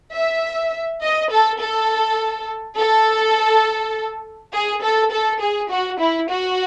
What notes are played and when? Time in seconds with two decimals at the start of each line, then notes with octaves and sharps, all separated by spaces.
0.14 E5
1.02 D#5
1.31 A4
1.61 A4
2.78 A4
4.53 G#4
4.82 A4
5.11 A4
5.41 G#4
5.70 F#4
5.99 E4
6.29 F#4